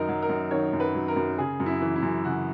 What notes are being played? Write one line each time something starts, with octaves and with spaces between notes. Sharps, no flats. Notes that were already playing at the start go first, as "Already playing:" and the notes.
Already playing: F#2 D#3 D#4 A#4
F#3
A#4
F#2
D#3 C#5
F#2
B4
F#3
A#4
F#2
C#3 G#4
F#2
E4
E3
E4
F#2
C#3 F#4